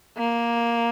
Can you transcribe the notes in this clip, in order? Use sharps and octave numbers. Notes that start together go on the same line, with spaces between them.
A#3